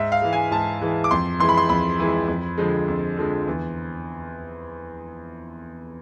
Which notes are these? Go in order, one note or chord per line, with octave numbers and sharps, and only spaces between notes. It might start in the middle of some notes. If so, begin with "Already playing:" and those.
Already playing: G#2 E5
F5
E3 G#3
G#5
G#2 A5
E3 G#3
D6
F2 C6
E3 G#3 C6
B5
C6
F2 B5
E3 G#3
F2
D3 F3 G#3
F2
D3 F3 G#3
E2